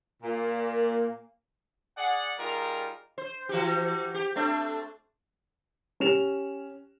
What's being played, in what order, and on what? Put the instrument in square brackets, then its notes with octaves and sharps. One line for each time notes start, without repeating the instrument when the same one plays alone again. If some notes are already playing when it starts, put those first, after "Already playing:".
[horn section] A#2 [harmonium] A#3
[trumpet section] G#4 D5 F#5
G3 D#4 F4 G#4 A#4
[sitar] C5
E3 F#4 G4
G4
A3 C4 D4
[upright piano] C#4 G4 E7 F7